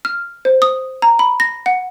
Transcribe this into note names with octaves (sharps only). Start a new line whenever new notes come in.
F6
C5
D#6
A#5
B5
A#6
F#5